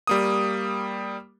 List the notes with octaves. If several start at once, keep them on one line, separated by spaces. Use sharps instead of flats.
G3 A#3 D#6